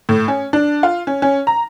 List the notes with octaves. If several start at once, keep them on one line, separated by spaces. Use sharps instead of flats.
A2
C#4
D4
F4
C#4
C#4
A#5